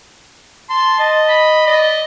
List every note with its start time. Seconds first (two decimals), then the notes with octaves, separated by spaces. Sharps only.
0.69 A5 C6
0.99 D#5 A5
1.28 B5
1.67 D5 D#5